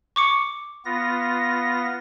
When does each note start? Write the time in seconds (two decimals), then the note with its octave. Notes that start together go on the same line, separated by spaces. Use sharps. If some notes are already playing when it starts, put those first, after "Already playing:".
0.16 C#6 D6 C#7
0.85 B3 F4 A#6